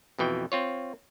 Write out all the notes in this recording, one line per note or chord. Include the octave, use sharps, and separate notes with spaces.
F2 B2 E3 G5
C4 F4 C#5